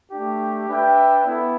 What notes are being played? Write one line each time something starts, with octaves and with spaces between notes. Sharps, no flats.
A3 D4 G4
D4 B4 E5 G5
B3 E4 A4